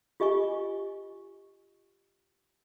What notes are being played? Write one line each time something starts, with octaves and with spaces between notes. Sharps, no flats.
F4 G4 D#5 G#5 C#6